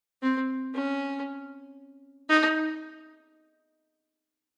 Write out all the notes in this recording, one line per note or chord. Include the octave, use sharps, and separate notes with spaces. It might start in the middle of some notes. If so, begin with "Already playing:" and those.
C4
C#4
D#4